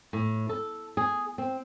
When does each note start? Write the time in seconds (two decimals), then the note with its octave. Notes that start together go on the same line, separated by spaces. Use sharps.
0.13 A2
0.49 A4
0.97 G#4
1.38 C4